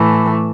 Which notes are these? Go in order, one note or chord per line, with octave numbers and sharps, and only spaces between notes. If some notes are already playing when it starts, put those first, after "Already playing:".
Already playing: A2 E3 A3